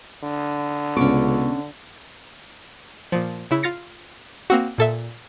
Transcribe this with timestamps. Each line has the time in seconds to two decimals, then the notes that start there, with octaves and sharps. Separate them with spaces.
0.24 D3
0.97 C#2 C3 B3 C#4 D5 C#6
3.12 A#2 F3
3.51 C#3 E4
3.63 F4 A6 A#6 C#7
4.50 A#3 C4 F#4
4.78 A#2 A4 E5